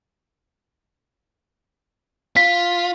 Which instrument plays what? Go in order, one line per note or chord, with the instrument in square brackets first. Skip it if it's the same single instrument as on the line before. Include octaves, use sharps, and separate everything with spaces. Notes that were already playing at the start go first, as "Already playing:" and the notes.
[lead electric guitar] F4 [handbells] B6